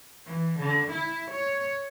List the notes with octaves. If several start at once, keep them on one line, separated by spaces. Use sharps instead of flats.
E3
D3
E4
C#5